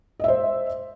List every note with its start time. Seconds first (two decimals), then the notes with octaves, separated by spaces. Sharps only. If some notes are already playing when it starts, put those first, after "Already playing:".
0.20 D#5
0.24 E5
0.28 C5